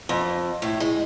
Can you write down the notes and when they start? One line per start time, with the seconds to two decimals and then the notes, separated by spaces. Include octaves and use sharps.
0.09 F2
0.62 A2
0.80 G#3